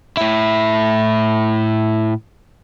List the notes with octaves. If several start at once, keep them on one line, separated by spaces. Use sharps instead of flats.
A2 E4